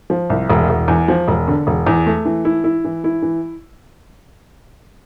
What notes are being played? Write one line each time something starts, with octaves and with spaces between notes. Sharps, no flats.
F3
C2
E1
E1
E2
F3
E1
D3
E1
E2
A3
E3
E4
E4
E3
E4
E3